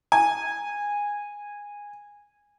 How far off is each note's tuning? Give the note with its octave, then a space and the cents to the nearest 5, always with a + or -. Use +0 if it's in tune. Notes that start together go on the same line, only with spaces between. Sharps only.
G#5 -15